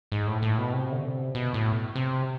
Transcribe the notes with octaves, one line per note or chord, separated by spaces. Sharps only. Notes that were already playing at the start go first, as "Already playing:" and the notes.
G#2
A2
A2
B2
C3
D3
C3
B2
A2
C3